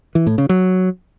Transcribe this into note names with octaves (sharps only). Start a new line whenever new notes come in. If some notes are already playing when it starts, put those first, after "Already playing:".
E3
A2
C#3
F#3